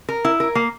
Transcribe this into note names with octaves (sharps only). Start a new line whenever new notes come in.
A#4
E4
A#4
A#3